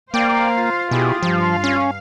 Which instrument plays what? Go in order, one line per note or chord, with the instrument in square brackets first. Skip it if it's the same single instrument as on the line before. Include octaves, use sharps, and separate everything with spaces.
[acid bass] A#3 [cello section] C5 F5 [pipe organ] D5 G5
[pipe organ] F4
[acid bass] B2 [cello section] E4 G4 G#4
[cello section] G2 F5 [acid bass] F3
[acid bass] C#4